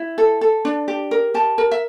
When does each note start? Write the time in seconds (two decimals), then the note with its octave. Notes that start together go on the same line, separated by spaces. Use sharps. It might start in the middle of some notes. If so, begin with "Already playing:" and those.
Already playing: E4
0.18 A4
0.41 A4
0.65 D4
0.88 G4
1.11 A#4
1.34 G4 A5
1.58 A#4
1.71 E5